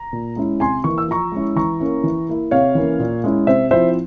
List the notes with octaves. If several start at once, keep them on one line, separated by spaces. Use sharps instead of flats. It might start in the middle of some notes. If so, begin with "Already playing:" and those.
Already playing: A#5
A#2
G#3 C#4 E4
C3 G#5 C6
E3 A#3 C#6
E6
F3 A#5 C#6
G#3 C#4 E4
E3 A#5 C#6
A#3 C#4 E4
E3
A#3 E4
C3 C#5 F5
E3 A#3 C#4
A#2
G#3 C#4 E4
C3 C5 E5
F3 C4 E4 C5 E5